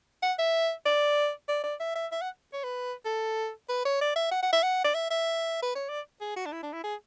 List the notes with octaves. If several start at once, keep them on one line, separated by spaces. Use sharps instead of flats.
F#5
E5
D5
D5
D5
E5
E5
E5
F#5
C#5
B4
A4
B4
C#5
D5
E5
F#5
F#5
E5
F#5
D5
E5
E5
B4
C#5
D5
G#4
F#4
D4
E4
D4
E4
G#4